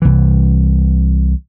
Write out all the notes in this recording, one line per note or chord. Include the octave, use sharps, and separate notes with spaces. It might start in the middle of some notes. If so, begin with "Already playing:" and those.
C2 E3